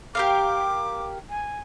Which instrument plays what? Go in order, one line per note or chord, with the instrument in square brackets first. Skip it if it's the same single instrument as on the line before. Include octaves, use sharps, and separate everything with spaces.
[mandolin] G4 A#4 F5 [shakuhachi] D6
[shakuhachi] G#5